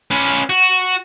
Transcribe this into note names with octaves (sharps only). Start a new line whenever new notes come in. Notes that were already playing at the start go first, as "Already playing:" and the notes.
C#4 B4
F#4